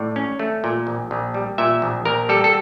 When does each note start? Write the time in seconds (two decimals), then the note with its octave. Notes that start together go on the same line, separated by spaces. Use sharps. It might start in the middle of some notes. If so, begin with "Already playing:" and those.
Already playing: A2 D5
0.16 C#4
0.39 A3
0.64 A#2
0.87 A#1
1.11 A#1
1.34 G3
1.58 A#2 E5
1.82 A#1
2.05 A#1 A#4
2.29 G3 A4
2.44 A4